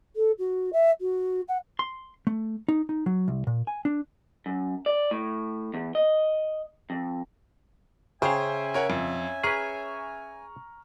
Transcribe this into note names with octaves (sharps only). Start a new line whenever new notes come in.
A4
F#4
E5
F#4
F#5
C6
A3
D#4
D#4
F#3
C2
A#2
G#5
D4
F#2
D5
A2
E2
D#5
F2
C#3 C#4 G#4 C5 E5 F5 G5 G#5
A#4 C#5 F#5
F2
G#4 B4 A#5 C#6 F6